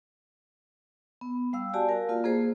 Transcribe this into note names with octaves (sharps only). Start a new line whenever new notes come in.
B3
G3 F5 E6
F#4 G4 D5 G#5 A5
A#4 F5
A#3 F4
A#3 G#4 C5